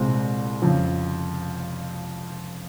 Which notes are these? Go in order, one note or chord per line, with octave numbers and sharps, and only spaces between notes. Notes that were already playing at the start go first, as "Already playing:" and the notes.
Already playing: C2 A#2 G#3 C4
F2 C#3 F3